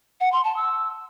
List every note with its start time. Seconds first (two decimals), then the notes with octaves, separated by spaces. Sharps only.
0.21 F#5
0.32 C6
0.44 A5
0.56 E6